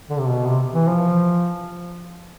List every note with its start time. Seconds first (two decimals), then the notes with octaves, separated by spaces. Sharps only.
0.10 D3
0.19 C3
0.28 B2
0.47 C3
0.73 E3
0.88 F3